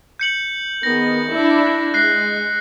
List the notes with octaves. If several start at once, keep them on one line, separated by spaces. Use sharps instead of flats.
G6 C#7 F#7
D#3 B3 G#4 A#6
D4 E4 E5
G#3 F#6 A#6 C7